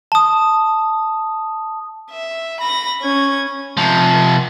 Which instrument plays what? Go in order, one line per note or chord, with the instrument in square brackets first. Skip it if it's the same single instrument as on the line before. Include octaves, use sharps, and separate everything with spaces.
[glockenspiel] A5 D#6
[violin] E5
B5 A#6
C#4 G#6
[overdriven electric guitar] C3 F3